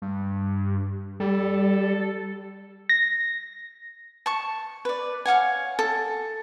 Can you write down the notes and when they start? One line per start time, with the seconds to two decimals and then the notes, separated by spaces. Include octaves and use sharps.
0.02 G2
1.20 G3 A4
2.89 A#6
4.26 A5 C#6
4.85 B4 D5
5.25 C#5 F5 F#5 G#5
5.79 A4